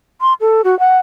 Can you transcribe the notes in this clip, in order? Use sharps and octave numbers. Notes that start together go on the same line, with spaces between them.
C6
A4
F#4
F#5